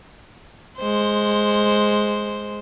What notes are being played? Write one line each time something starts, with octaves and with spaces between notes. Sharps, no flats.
G#3 C5